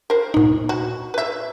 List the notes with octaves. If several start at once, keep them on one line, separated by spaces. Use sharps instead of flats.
A#4 C5
A#2 D#4
F#4
B4 E5